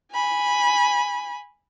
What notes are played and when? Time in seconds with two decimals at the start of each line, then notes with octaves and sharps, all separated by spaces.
0.12 G#5 B5